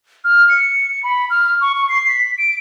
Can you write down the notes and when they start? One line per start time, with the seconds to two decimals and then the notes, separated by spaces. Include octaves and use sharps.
0.24 F6
0.49 C#7
1.03 B5
1.30 F6
1.61 C#6
1.75 C#6
1.89 C7
2.08 B6
2.38 D7